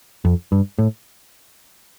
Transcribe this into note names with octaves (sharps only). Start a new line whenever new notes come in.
F2
G2
A2